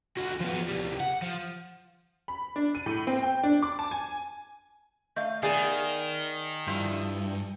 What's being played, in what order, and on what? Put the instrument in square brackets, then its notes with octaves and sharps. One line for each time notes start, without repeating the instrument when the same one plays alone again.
[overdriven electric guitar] C#2 F#4
F3 B3
C#2 G3
F#5
F3
[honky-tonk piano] B5
D4
D#7
A2
C4
G5
D4
D6
A5
G#5
[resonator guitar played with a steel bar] A3 D#5 F5
[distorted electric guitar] D#3 [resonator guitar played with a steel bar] B3 D5 F5 [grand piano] G#4
[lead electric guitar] G2 [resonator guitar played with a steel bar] F3 E4